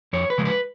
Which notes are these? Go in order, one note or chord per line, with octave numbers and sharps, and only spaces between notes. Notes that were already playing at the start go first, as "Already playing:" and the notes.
F2 C#5
B4
C#3 F3 G#3
B4